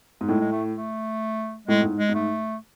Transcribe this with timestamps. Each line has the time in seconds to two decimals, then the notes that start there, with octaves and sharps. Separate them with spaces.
0.21 G#2
0.28 A2 G#3
0.40 G#3
0.52 A3
0.76 A3
1.68 A2 G#3
1.81 G#2
1.99 G#3
2.09 G#2
2.14 A3